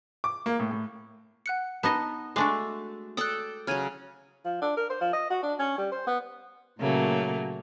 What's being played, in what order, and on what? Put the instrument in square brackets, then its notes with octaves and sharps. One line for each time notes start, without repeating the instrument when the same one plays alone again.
[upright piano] D6
A#3
A2
A2
[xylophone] F#5 F#6 C#7
[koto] B3 D#4 D#5 [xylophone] A5
[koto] G#3 D4 F#4 [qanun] A3 [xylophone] G#5 D6 C7
[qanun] A4 D5 G5 [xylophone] D#6 F#6
[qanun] C#3 F#3 [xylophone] F6 G#6 D#7
[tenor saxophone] F3
D4
A#4
C5
F3
D#5
F#4
D4
C#4
G3
C5
B3
[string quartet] A#2 C#3 F#3 A3 A#3